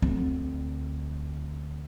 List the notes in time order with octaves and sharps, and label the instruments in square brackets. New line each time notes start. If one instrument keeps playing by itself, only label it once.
[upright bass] D2 C4